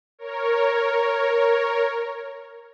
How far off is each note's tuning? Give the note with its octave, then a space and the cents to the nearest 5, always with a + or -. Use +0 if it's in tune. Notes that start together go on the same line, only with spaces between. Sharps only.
A#4 +0 C#5 +0